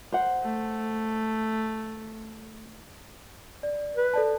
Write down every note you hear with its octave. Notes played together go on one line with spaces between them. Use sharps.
C5 F#5
A3
D5
B4
A4 D5 A5